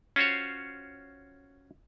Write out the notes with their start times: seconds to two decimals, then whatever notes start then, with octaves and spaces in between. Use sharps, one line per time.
0.16 C#4 F4 F#4 C5 C#5